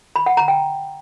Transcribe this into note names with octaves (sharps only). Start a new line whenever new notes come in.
B5
F#5
A#5
G5